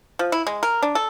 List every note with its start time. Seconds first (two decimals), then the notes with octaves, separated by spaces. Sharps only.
0.19 F3
0.32 E4
0.47 G#3
0.63 A#4
0.82 D4
0.95 A4